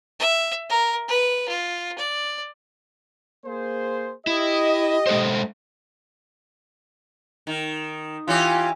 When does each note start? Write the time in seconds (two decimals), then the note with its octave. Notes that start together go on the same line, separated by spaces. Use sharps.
0.20 E5
0.70 A#4
1.08 B4
1.48 F4
1.98 D5
3.46 A#3 G#4 C5
4.27 E4 G4 D#5
5.07 G#3 A4 C5
7.47 D#3
8.28 E3 C#4 F4 G4